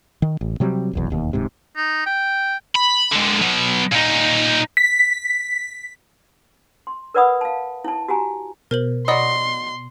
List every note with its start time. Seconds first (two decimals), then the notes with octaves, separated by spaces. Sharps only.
0.22 D#3
0.41 A1
0.60 C3 F#3 G3 C4
0.93 F1 B1 E2
1.10 E1 D#2
1.33 D1 G#2 C3
1.76 D#4
2.06 G5
2.75 B5
3.11 D3 G#3
3.42 F#3 B3
3.93 A#2 D#4
4.77 B6
6.87 C6
7.14 A#4 B4 D5 F#5 B5 D#6
7.41 F5 A5
7.85 E4 A5
8.08 F#4 G4 G#5 A#5
8.71 B2 A#4 C5 F#7
9.08 F#3 D5 D#5 F#5 B5 C6